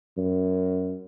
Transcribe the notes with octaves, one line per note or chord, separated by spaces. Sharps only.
F#2